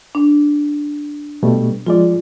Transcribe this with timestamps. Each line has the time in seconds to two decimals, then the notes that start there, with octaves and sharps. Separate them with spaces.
0.15 D4
1.43 B2 G3 A3
1.87 F3 G#3 F4 D5